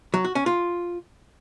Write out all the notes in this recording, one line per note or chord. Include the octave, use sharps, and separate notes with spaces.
F#3
F#4
C#4
F4